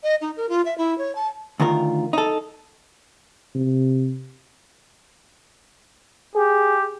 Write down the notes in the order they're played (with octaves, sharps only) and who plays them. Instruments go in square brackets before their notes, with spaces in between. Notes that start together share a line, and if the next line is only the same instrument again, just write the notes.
[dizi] D#5
D#4
A#4
F4
E5
E4
C#5
A5
[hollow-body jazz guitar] D2 D#3 F4 A#4
D#4 A4
[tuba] C3
[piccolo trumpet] G4 [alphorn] G#4